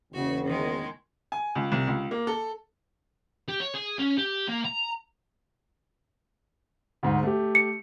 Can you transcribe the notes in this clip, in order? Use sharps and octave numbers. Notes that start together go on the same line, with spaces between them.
F#1 E2 C#3 F#4
D#3 G#3
G#5
C#2
C2
C#2
A#3
A4
G4
C#5
G#4
C#4
G4
A#3
A#5
D2 G#2
A3 G4
C#7